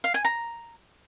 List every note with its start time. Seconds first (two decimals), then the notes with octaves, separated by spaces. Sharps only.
0.04 F5
0.14 G#5
0.25 A#5